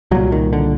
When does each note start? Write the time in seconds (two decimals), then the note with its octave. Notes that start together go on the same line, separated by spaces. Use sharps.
0.11 C2 A#2 F#3
0.32 D#3
0.53 D3